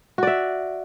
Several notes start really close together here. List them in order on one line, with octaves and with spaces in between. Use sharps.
F#4 D5 E5